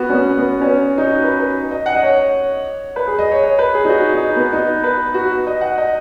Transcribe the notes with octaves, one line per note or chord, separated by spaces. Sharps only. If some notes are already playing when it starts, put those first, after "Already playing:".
Already playing: B3 F#4
C#4
B3
B3
C#4
D#4
F#4
B4
B4
D#5
F#5
D#5
C#5
B4
G#4
D#5
C#5
C#5
B4
G#4
D#4
F#4
D#4
B3
D#4
B4
F#4
D#5
F#5
D#5